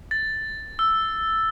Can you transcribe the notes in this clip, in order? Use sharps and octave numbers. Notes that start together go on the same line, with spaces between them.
A6
E6